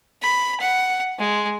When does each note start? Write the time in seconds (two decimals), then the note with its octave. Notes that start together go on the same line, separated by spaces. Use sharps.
0.22 B5
0.60 F#5
1.19 G#3